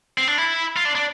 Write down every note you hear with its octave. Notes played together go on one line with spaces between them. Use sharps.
C4
D4
E4
F4
D4
D4